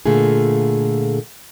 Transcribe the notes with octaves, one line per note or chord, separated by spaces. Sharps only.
A#2 D3 A3 F4 G#4